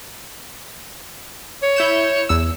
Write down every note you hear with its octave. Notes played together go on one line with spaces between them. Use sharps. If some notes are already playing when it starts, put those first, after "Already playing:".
C#5
E4 G6 E7
E2 E6